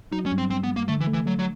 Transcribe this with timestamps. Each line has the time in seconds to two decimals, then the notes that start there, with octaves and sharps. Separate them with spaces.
0.12 F#3 D#4
0.26 C#4
0.32 G2
0.38 C4
0.50 G2 C4
0.63 B3
0.69 G2
0.76 A#3
0.88 D3 A3
1.01 E3
1.07 A3
1.13 E3
1.26 F#3 A3
1.39 F#3